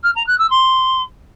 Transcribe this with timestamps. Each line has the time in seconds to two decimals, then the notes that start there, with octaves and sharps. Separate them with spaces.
0.03 F6
0.15 A#5
0.26 F#6
0.38 E6
0.50 C6